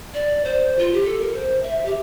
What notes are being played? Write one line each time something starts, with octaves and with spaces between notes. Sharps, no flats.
D5
C5
F4
G4
A4
A#4
C5
E5
G4